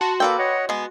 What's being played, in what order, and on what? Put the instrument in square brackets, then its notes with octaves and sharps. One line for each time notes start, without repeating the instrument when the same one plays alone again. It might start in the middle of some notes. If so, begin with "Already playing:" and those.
[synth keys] F#4 C6 [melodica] A5
[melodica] A#3 A4 [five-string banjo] B4 D5 G5
[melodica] C#5 D#5 F#5
[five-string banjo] G#3 B3 [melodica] G#5